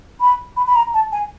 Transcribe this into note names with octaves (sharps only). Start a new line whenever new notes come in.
B5
B5
B5
A#5
A5
G#5